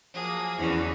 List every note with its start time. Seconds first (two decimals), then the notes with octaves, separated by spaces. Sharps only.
0.14 F3 F#3 A#3 G#4
0.58 E2 D3 E3 F#3 C#4 E4